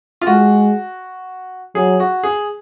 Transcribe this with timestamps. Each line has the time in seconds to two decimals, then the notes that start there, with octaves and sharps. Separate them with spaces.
0.21 F4
0.27 G#3 F#4
1.75 F#3 G#4
2.00 F#4
2.23 G#4